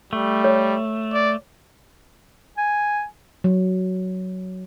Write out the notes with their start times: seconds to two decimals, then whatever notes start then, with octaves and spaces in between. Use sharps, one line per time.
0.13 G3 A3
0.44 C#5
1.13 D5
2.57 G#5
3.44 F#3